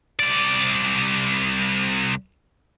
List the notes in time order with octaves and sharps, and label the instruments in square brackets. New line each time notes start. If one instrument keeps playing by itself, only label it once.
[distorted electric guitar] C2 D5